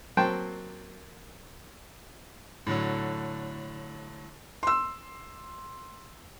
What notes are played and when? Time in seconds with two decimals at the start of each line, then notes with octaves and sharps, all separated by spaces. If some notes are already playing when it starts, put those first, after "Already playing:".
0.17 F#3 A#3 C4 G5 A5 C6
2.67 A2 D3 F#3
4.63 C6 E6